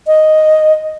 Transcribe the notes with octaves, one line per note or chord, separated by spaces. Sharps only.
D#5